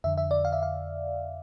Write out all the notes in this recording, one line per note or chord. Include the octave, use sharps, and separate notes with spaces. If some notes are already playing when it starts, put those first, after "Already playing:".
F2 D3 E5
E5
D5
F5
E5
F5